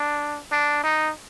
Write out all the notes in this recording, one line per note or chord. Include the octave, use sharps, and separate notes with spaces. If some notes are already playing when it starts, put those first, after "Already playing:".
Already playing: D4
D4
D#4